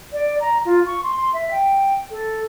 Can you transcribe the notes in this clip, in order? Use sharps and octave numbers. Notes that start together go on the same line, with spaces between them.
D5
A#5
F4
C#6
C6
C6
E5
G5
A4